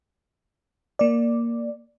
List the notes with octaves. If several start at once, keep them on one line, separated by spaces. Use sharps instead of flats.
A#3 D5